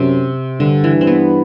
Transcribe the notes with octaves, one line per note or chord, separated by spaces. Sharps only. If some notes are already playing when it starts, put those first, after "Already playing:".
Already playing: F#2 C3
G2 D3
E3
C4
B3